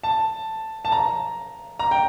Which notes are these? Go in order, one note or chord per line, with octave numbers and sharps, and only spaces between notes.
A5
A5
A#5
A#5
G5